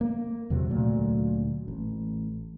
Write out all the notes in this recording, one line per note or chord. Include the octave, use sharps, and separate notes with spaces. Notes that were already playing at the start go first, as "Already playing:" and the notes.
A#3
E2 C3 F#3
D2 A#2 F#3 A3
A1